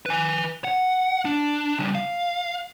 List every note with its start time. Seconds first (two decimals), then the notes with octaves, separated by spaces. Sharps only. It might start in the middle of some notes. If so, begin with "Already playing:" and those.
0.06 B4 G#5
0.64 F#5
1.25 D4
1.79 C#3 G3
1.95 F5